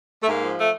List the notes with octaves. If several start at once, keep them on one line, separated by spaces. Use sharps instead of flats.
A3
G#2 A#3
F3
A3